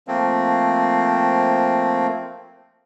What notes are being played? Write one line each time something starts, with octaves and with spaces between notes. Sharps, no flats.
F3 A3 A#3 C4